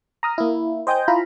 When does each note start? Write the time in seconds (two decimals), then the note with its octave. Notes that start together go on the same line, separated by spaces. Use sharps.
0.23 A#5 D#6 F6
0.38 A#3 E4
0.87 C5 D#5 G5 G#5 D#6 G6
1.08 E4 F4 F5 A#5 B5